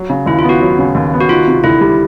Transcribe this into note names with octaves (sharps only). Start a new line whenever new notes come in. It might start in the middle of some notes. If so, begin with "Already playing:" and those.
Already playing: F#3
C#3
D#2 E4
F4
B3 F#4
F#3
C#3
D#2
B3
F#4
D#3 F4
C3
D2 E4
G3